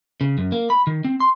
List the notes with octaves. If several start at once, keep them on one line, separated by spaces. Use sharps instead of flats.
C#3
F#2
A#3
B5
D#3
C4
C6